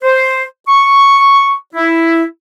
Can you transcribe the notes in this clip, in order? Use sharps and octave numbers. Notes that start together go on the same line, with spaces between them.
C5
C#6
E4